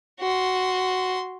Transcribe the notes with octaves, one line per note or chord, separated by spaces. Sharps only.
F#4 C6